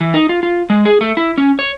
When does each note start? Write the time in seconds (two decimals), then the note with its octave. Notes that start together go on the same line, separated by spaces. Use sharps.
0.01 E3
0.14 D#4
0.29 F4
0.43 F4
0.70 G#3
0.85 G#4
1.01 A3
1.17 E4
1.38 C#4
1.59 C#5